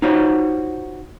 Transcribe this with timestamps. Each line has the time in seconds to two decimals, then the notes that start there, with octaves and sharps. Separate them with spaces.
0.02 D#4 F4 F#4 C5 C#5